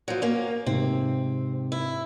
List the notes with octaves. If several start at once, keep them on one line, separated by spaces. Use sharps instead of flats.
F3 F#3
A#3 C#4
G#2 C3 C4
E4